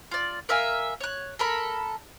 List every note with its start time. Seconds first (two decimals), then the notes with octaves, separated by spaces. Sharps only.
0.11 F4 D5
0.49 A#4 E5 F5 G#5
1.00 C#5 F#6
1.39 A4 A#4 B5